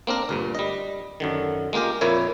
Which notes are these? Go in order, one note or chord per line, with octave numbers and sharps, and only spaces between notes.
A#3 C4 D4 A#4
D2 G2 A#2
G3 D#5
F#2 D3 D#3
G#3 A#3 F4 G4 A#4
F2 A#2 A#3 E4 C#5